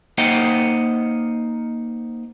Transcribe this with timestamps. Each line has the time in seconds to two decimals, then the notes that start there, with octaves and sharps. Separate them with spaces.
0.18 A#3 D#4 C5 D#5 F#5 G5